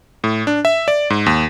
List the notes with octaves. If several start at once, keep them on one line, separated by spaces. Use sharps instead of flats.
A2
D4
E5
D5
G#2
D#2